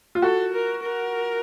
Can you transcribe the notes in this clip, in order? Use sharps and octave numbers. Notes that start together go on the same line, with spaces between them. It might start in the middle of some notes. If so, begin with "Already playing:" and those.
F4
F#4 A4
A#4
A#4